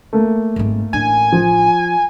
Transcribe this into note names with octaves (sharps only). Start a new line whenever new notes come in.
A3 A#3
G#1 G#3
A1 D4 G#5
F3